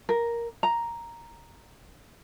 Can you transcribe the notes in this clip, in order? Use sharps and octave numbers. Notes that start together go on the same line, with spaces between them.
A#4
A#5